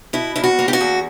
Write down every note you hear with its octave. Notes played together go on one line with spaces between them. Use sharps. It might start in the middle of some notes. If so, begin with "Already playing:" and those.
B2 E4
E2 E4
F#4
A#3
G4
F#4
E2